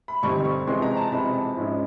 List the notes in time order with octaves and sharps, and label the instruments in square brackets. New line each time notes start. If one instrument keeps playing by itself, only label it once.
[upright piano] B5
G2 D3 G3 C4 D#4 C#6
C#6
F2 C3 E3 G#3 C6
A#5
A5
F2 C3 E3 G#3 B5
G#2 F3 G#3 C#4 E4